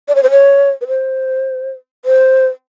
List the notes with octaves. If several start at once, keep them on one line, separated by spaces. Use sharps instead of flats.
D5
C#5
C5
C#5
B4
C5
C5